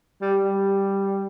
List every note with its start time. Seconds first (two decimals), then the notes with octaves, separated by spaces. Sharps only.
0.21 G3
0.44 G3